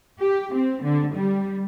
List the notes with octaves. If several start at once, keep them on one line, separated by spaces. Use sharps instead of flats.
G4
C4
D3
G3